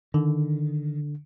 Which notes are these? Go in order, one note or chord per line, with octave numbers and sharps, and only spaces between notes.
D3 D#3